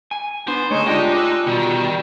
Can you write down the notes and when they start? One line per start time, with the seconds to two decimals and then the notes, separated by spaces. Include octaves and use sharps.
0.11 G#5
0.48 B3 D4 C5
0.71 D3 G#3 A3 D#4 C#5 G#5
0.87 G#3 D4 D#4 F4 G4 D#5 G5
1.17 E6 F#6
1.47 B2 D#3 G3 F#4